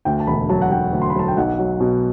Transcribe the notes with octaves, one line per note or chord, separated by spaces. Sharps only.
D2 G5
A5
E1 B5
F#3 A5
F#5
F#3 G5
D2
C6
B5
F#3 A5
G5
B1 F#5
F#3
B2